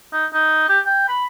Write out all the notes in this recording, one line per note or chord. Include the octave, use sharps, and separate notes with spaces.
D#4
D#4
G4
G5
B5